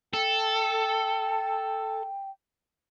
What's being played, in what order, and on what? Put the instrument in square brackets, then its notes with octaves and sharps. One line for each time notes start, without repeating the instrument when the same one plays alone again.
[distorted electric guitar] A4 [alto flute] G5